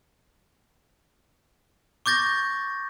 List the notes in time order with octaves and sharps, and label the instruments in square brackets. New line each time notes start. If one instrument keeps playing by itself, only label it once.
[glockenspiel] C#6 D6 G6 A6 A#6